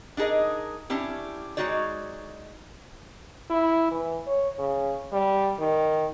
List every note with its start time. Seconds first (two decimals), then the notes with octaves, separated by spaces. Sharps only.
0.17 D4 D#4 G#4 A#4 D#5
0.90 C#4 D4 E4 G4
1.57 G#3 C4 D#4 F#4 C#5 D5
3.50 E4
3.91 E3
4.27 C#5
4.59 C#3
5.13 G3
5.59 D#3